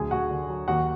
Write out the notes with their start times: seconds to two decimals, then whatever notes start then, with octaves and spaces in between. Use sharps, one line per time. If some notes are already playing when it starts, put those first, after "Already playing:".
Already playing: D2 F#3 G#4 G#5
0.11 D2 F#4 F#5
0.30 D3
0.49 F#3
0.68 D#2 F#4 F#5